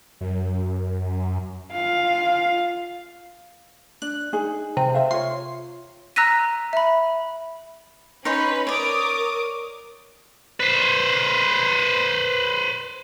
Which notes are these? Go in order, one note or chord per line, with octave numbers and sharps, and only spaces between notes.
F#2
F4 F5
D4 F#6
D#4 G#4
C3 C5
C5 E5 F5
F4 C#5 C6
A#5 E6 F#6 A#6 B6 D#7
E5 B5
C#4 D#4 B4 C#5 C6
A#4 C#5 D5 D6 D#6
B4 C5